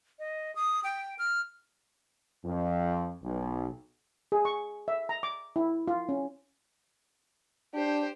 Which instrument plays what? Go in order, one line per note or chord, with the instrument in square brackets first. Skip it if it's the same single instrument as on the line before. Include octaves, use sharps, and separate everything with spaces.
[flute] D#5
D#6
G5
F6
[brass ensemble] F2
B1
[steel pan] G#4
C#6
E5
A#5
D6
E4
F4
C#4
[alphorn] D4 [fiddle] G4 C5